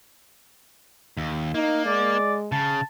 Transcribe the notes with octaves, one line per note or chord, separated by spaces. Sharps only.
D#2
A#3 D#4
G#3 D5
C#3 A5